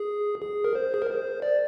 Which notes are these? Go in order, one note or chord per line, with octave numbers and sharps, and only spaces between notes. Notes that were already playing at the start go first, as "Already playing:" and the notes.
Already playing: G#4
G#4
A#4
C5
G#4
A#4
C5
D5